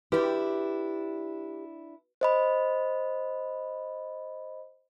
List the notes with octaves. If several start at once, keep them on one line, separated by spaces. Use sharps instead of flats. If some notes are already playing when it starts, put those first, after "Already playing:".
D4 E4 F#4 G4 B4
C5 D#5 B5